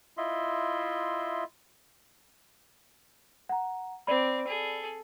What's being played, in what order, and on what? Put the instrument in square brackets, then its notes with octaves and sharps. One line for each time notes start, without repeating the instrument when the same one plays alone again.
[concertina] E4 F4 D#5 E5 C6
[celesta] F#5 A#5
[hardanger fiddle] C4 D6 [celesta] D5 B5
[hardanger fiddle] G#4 A4